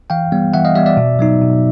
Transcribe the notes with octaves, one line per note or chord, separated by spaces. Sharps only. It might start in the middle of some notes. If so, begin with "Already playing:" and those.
E3 F5 G5
G3 B3
E3 E5 F#5
D#5 F5
G3 B3 D5 E5
D5 E5
B2
F#3 B3 D#4
B2